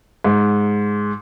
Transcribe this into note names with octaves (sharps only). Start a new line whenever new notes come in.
G#2